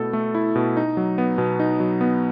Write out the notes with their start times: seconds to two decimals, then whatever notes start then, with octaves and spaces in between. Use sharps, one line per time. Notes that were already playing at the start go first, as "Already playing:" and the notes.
Already playing: B2 A3 E4 A4
0.13 A3
0.35 E4
0.56 B2
0.77 D#4
0.97 F#3
1.18 B3
1.38 B2
1.60 D#4
1.80 F#3
2.01 B3